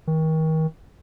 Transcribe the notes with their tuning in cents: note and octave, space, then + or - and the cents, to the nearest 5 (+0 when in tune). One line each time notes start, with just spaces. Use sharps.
D#3 +35